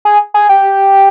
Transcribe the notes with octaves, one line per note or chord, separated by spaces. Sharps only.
G#4
G#4
G4